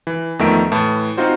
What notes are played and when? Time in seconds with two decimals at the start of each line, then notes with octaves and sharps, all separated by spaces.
0.07 E3
0.39 E2 D#3 F3 A3 E5 D7
0.72 A2 E3 A5
1.17 C4 D#4 F4 F#4 C5